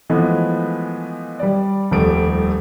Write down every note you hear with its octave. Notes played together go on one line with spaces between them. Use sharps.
E3 F3 G#3 A3 B3
G3 D5
D#1 F2 G3 A3 D7